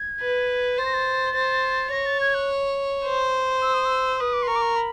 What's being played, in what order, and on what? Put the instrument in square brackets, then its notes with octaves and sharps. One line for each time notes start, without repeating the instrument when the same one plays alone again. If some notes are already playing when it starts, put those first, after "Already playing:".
Already playing: [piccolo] G#6
[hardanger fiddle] B4
[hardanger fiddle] C5 [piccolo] A6
[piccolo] A#6
A6
[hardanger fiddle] C5
[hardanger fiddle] C#5 [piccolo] A#6
[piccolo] A6
G#6
F#6
[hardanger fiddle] C5
[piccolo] E6
D#6
E6
[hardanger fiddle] B4 [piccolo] D#6
[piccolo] D6
C6
[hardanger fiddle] A#4 [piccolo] C#6
[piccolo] D6
C#6
B5